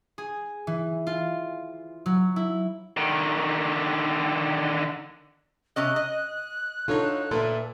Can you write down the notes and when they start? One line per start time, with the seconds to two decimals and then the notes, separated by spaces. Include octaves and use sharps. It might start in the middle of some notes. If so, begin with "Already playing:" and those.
0.18 G#4
0.67 E3
1.07 F4
2.06 F#3
2.36 E4
2.97 D3 D#3
5.76 C3 C#4 D#5 F#6
5.96 D#5
6.88 D3 D#4 F4 A4 C#5
7.31 A#2 A4 B4 E5